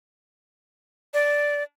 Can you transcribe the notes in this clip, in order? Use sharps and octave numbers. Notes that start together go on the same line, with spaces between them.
D5